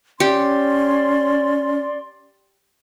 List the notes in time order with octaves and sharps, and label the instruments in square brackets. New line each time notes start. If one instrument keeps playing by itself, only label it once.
[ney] C#4 [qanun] G4 [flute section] D5 C6